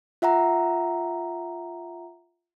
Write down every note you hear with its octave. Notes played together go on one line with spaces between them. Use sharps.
F4 E5 F#5 A#5